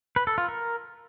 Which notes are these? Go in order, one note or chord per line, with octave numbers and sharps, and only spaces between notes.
B4
A4
F4
A#4